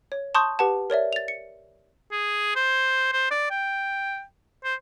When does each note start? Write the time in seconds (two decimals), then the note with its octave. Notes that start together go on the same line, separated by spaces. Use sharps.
0.12 C#5
0.35 A5 C6 C#6 D#6 G6
0.59 G4 B4 F#5 A5
0.90 A#4 C#5 D5 E5
1.13 A6 F7
1.28 C#7
2.12 G#4
2.55 C5
3.12 C5
3.31 D5
3.50 G5
4.64 C5